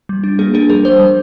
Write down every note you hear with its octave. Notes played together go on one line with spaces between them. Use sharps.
G3
D4
A#3 G#4
D4 G#4
G3 A#4
G3 C5
G3